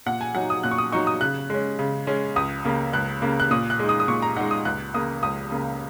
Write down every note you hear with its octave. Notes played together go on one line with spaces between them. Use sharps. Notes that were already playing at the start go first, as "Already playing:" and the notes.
A#2 F#5
G#5
F#3 D#4 F#5
D#6
A#2 F#6
C#6
D#6
F#3 D#4 C#6
D#6
C#3 F#6
G#3 C#4
C#3
G#3 C#4
C#2 D#6
C#3 A#3
C#2 F#6
C#3 A#3
F#6
A#2 D#6
F#6
G#3 D#4
D#6
D#6
A#2 C#6
A#5
G#3 D#4 F#5
D#6
C#2 F#6
C#3 A#3 D#6
C#2 D#6
C#3 A#3